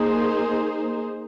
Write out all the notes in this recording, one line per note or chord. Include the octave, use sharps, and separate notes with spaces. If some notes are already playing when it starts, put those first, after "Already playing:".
Already playing: A#3 D#4 G#4 C5